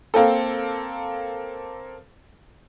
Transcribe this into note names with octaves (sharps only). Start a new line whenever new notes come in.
A#3 C4 A4